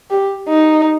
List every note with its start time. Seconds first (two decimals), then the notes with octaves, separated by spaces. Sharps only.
0.10 G4
0.49 D#4